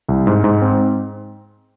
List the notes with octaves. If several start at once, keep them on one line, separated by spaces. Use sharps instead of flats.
C2
G#2
G#2
C4